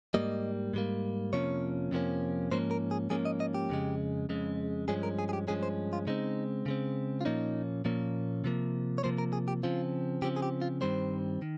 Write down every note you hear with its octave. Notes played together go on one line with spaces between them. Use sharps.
G#2 G3 A#3 D#5
G#2 G3 A#3
F2 C3 F3 A#3 C#4 C#5
F2 C3 F3 A#3 C#4
G#2 F3 A#3 C#4 C5
A#4
G#4
G#2 F3 A#3 C#4 G#4
D#5
D#5
G4
F2 C#3 G#3
F2 C#3 G#3
G2 F3 G#3 C#4 G#4
A#4
G#4
G#4
G4
G2 F3 G#3 C#4 G#4
C5
F4
C#3 G#3 C4 D#4
C#3 G#3 C4
F4
A#2 F3 A#3 C#4 D#4
A#2 F3 A#3 C#4
C3 F3 A#3
C#5
C3 F3 A#3 C5
A#4
G#4
G4
C#3 F3 C4 F4
C#3 F3 C4 G4
G#4
G4
F4
G2 D#3 G3 C4 C5
D#3